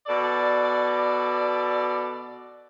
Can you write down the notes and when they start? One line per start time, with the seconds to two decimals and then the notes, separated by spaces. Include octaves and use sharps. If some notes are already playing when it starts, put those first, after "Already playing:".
0.07 B2 A4 D5